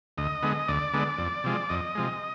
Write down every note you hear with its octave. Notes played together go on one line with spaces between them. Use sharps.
D2 D#5
D3 G#3 B3
D2 D5
D3 G#3 B3
F2
C3 F3 G#3
F2 D#5
C3 F3 G#3